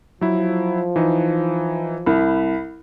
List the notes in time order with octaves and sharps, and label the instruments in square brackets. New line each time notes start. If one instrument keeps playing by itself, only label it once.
[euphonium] F3 [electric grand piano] F#3 E4
[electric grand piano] E3 D#4
[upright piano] C2 [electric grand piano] B5